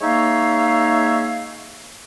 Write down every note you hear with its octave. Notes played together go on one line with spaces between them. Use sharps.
G#3 A#3 D#4 C#5 E5 F5